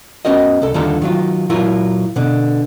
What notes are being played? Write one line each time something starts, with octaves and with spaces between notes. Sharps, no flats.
B3 C#4 F#4 A#4 D#5
C2 A4
D#2 D3 G3 F4 A4 A#5
D#3 F#3 F4
A#2 F#3 E4 F4 A#4
B2 D3